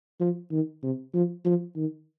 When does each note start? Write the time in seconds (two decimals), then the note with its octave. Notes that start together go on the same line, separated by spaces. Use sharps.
0.20 F3
0.52 D#3
0.83 C3
1.14 F3
1.45 F3
1.76 D#3